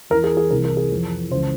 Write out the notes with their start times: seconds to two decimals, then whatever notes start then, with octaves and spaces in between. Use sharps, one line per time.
0.10 E2 E3 A#4
0.24 G#4
0.37 G#4
0.51 C2 C3 E3 A#4
0.65 A#4
0.77 G#4
0.91 F2 E3
1.31 C#2 C#3 E3 C5